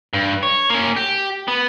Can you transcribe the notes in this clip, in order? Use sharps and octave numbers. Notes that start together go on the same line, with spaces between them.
G2
C#5
A#3 C#4
G4
B3